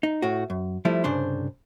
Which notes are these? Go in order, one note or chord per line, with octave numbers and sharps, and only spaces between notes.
D#4
A2 F#4
F#2
F3 G3 A3 E4
C2 G2 C#3 D4 C5